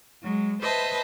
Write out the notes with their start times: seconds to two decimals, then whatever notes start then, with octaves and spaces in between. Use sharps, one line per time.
0.23 F#3 G#3
0.61 B4 C5 D#5 E5 A5